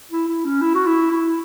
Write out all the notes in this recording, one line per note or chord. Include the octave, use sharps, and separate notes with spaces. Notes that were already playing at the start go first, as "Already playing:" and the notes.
E4
E4
C#4
E4
F#4
E4
E4